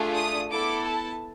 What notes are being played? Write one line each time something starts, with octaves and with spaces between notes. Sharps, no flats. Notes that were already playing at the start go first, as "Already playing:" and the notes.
Already playing: A3 D4 F4 G#4
D#6
B3 E4 A4 D6
A5